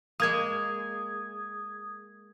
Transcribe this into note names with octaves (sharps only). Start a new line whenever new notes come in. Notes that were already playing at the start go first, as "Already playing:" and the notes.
G#3 A#3 D#6 G#6